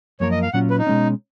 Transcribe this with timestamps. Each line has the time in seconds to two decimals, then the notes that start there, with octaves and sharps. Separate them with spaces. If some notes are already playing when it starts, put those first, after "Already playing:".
0.20 F#2 F3 A#3 F4 A#4 C#5
0.31 D#5
0.42 F5
0.53 A#2 F#3 C#4 F4 F#5
0.70 B4
0.79 D#4
0.87 B2 G#3 C#4